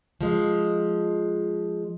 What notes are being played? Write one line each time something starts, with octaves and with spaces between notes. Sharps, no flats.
F3 G#3